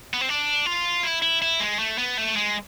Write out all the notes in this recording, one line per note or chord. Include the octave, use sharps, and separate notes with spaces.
B3
C4
D4
F4
E4
E4
E4
G#3
A3
B3
A3
G#3